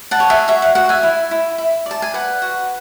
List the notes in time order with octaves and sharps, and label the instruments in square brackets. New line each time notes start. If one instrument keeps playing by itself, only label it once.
[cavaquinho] F#5 A5
C#5
E5 G#5
F#4 E5
F#5
F#4 F#5
E5 G#5
E4
E4
E4
D5 A5
G#5
B4 F#5
F#4